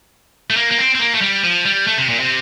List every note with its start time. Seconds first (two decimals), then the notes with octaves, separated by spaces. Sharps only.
0.50 A3
0.57 A#3
0.71 A#3
0.78 C4
0.95 C4
1.00 A#3
1.15 A3
1.22 G3
1.44 F3
1.65 G3
1.87 A3
1.98 C3
2.09 A#2
2.20 C3